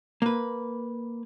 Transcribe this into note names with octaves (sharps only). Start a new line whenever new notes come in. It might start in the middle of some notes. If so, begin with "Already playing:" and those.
A#3 B4